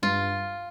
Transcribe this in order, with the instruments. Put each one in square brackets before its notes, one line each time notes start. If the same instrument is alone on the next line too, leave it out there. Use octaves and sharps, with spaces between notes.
[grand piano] G2 [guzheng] F4